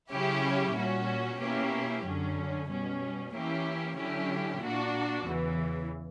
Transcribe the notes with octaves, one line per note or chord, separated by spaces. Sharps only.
C#3 F#3 C#4 E4 G4
A#2 G3 C#4 F#4
B2 A#3 C#4 E4 G4
F#2 D3 F#3 C#4
B2 G3 C#4
E3 A#3 C#4 E4 G4
D3 F#3 C#4 E4 G4
A#2 A#3 D4 F#4
E2 C#3 E3